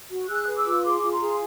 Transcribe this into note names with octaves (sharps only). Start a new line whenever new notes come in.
F#4
G#4 E6 F#6
B4
D6 E6
F4
G#4 C6 D6
F4
A#5 C6
G#4